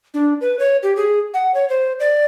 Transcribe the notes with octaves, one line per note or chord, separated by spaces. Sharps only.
D4
B4
C#5
G4
G#4
F#5
C#5
C5
D5